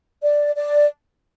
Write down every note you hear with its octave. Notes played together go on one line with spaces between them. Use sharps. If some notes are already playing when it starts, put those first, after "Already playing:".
D5
D5